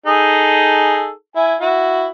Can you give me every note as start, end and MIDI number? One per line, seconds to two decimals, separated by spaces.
0.06 1.11 63
0.06 1.11 68
0.06 1.11 69
1.36 1.55 64
1.36 1.55 80
1.61 2.08 64
1.61 2.08 66